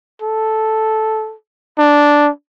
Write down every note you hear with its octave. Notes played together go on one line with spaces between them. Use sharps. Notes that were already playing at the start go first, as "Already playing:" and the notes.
A4
D4